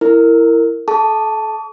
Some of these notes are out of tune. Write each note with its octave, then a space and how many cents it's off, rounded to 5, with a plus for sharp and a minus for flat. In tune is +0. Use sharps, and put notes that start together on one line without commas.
E4 +10 A#4 -20
A4 -35 A5 +0 C#6 +45